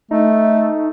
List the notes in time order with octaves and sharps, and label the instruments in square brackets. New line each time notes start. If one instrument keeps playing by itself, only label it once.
[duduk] A3 [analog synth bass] D#4